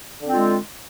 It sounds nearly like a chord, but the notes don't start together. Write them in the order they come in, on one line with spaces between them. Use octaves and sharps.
D3 C4 F4 G#3